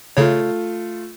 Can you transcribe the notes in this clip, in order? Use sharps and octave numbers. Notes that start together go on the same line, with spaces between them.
C#3 A3 F4 C#5